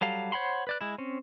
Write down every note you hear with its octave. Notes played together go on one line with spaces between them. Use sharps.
F#3 G3 A4 F5
C5 C#5 F#5 B5 C6
B4 D5 F#6
G#3 E4
C4 C#4